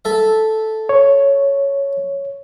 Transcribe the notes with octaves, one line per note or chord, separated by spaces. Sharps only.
A4 E5
C#5